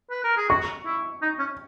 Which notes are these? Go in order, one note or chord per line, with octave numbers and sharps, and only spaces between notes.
B4
A#4
G#4
F#4 C#6
E4
D#4
C#4